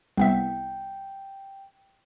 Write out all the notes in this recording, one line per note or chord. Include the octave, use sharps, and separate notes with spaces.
C2 B3 E5 G5